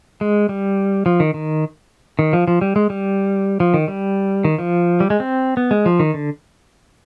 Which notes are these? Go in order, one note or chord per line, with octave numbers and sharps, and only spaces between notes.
G#3
G3
F3
D#3
D#3
D#3
F3
F3
G3
G#3
G3
F3
D#3
G3
D#3
F3
G3
G#3
C4
B3
G#3
F3
D#3
D3